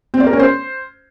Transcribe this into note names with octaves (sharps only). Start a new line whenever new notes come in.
C4
D5
A#4
C#4
C5